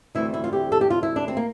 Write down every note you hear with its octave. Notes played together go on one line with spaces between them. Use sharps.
D2 C3 E3 G3 E4
E4
F4
G4
A4
G4
F4
E4
D4
C4
A#3